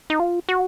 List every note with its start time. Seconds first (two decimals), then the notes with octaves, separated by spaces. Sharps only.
0.10 D#4
0.20 F4
0.49 F#4